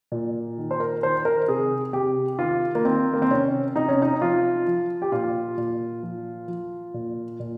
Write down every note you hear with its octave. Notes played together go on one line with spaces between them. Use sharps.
A#2
D#3
C5
A#4
D#3 C5
A#4
C3 G#4
C3 G4
D#3 F4
A#3
D#3 C4
A#3
C4
C3 C#4
C3 D#4
C#4
D#4
F3 F4
F3
G4
A#2 F4
A#2
F3
F3
A#2
A#2